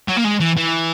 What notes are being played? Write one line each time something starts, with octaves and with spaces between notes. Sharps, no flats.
F#3
A#3
G#3
E3
E3